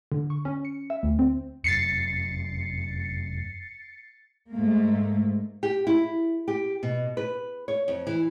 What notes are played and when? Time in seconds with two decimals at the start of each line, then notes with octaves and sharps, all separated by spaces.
0.12 D3
0.30 C#6
0.45 C#4
0.65 C#7
0.90 E5
1.03 D2
1.19 C4
1.64 F1 F#2 A6 C7 C#7
4.52 G#2 A3 A#3
5.63 G4
5.87 E4
6.48 G4
6.83 B2
7.17 B4
7.68 C#5
7.88 F2
8.07 E3